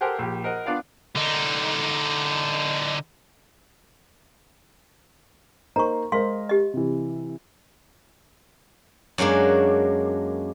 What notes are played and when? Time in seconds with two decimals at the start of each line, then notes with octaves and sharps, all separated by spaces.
0.01 G4 A4 A#4 C5 F#5 G#5
0.19 A#1 G4
0.44 A#4 C5 D#5 F#5
0.66 B3 D4 F4 D5 F5 F#5
1.15 D3 D#4
5.76 A#3 D#4 C5 A#5 C#6
6.12 G#3 A#4 C5 F5 C6
6.49 G4 D#5
6.74 C3 E3
9.18 F#2 F#3 G#3 A#3 D4